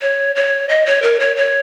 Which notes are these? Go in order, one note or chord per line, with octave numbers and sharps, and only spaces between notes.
C#5
C#5
D#5
C#5
A#4
C#5
C#5